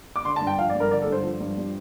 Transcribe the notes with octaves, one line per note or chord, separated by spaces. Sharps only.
D6
D3 C6
A5
G2
G5
F3 F5
D5
G2
A#4
D3 D5
A4
G2
C5
F3
G2
G3